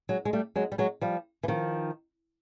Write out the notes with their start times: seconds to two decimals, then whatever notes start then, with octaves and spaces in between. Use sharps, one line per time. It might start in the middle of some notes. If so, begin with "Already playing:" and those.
0.09 F#3 G#3
0.25 G#3
0.33 G3 A3
0.56 F#3 G#3
0.72 G3
0.78 F#3 G#3
1.01 F3 G3
1.43 E3
1.48 D#3 F3